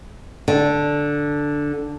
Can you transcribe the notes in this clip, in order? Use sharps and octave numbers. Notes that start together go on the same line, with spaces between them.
D3